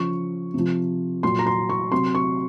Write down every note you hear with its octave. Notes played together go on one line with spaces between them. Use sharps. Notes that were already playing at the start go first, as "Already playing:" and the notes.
Already playing: C#3 F3 C#6
C3 F3
A#2 F#3 C6
A#5
C6
C#6
C3 F#3 C6
C#6